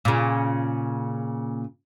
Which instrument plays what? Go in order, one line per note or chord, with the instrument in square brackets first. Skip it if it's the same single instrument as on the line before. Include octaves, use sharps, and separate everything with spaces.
[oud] A#2 C#3